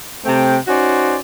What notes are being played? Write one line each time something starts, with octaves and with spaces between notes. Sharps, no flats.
C3 A3 C4 G5
C#4 D#4 F#4 C5 D5